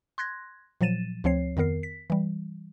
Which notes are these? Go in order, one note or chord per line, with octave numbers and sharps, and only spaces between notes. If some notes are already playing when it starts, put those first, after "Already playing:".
C6 F#6 G#6 A#6
A#2 F3 F#3 A6 D#7 E7
D2 F3 C4 C#5 C7
F2 D#3 B3 A#4 C7
B6
E3 G3